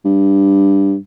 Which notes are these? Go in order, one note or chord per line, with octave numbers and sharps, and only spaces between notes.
G2